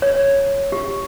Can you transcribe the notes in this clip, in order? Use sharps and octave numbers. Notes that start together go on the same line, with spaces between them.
C#5
G4